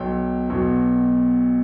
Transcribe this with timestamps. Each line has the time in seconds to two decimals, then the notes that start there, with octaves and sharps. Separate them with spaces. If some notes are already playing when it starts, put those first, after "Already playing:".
Already playing: B1 B2 F#3 G5
0.50 B1 B2 F#3